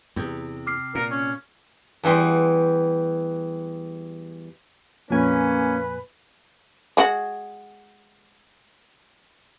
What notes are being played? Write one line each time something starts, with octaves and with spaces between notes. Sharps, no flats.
E2 C3
D6 F6 C7
A#2 A#4
C#4
E2 E3 G3 C6
F2 A#2 A#3 C#4 B4 G#5
G#3 F#4